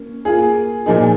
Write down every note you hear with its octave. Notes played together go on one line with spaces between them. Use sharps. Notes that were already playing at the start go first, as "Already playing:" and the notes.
Already playing: A#3 C#4
A#3 F4 G#4
A#2 F3 A#3 D#4 G#4